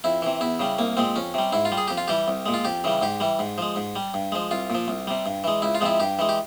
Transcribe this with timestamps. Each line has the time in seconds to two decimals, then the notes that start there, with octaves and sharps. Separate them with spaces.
0.04 F2 E4
0.22 C3 E3
0.41 E2 E4
0.59 C#3 G3
0.79 C2 A#3
0.97 A#2 G#3 C4
1.16 F2 C#4
1.34 C3 G3
1.53 G#2 E4
1.65 F4
1.72 G3
1.78 G#4
1.88 F2 G4
1.98 F4
2.08 E3 G3 G4
2.28 C2
2.46 A#2 G#3
2.54 F4
2.65 F2 G4
2.84 C#3 E3 G3
3.02 G#2 G4
3.20 E3 G3
3.39 G#2
3.58 F3 G#3
3.76 G#2
3.96 G3
4.14 G2
4.32 F3 G#3
4.51 C2 F4
4.70 A#2 F3
4.88 C2
5.07 C3 G3
5.26 G2
5.44 E3 G#3
5.62 C#2 E4
5.75 F4
5.81 C3 F3 G#3 E4
6.00 G2 G4
6.19 E3 G#3
6.29 G4